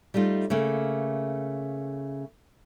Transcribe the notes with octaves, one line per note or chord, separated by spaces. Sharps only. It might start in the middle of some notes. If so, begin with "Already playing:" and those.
G3 A3 D#4 F4
C#3 A3 A#3